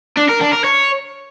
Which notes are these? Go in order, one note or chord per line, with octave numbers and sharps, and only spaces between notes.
D4
A#4
D4
A#4
C#5